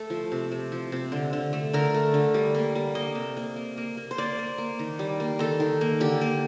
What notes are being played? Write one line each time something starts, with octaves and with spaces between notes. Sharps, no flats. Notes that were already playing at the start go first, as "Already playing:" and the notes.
Already playing: A3 A4
F3
C3
C3
F3
C3
D3
D3
A3
D3 A#4
A3
D3
G3
A#3
G3
A#3 D#5
C3
A#3
A#3
A#3
A#3
C5
A#3 D5
A#3
A#3
D#3
G3
A#3
D#3 A4
D#3
A#3
D3 G4
A#3